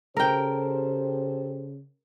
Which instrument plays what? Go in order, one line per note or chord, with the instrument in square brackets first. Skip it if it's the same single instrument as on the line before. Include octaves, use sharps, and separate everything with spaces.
[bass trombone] C#3 [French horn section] G4 A4 C5 [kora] A#4 G5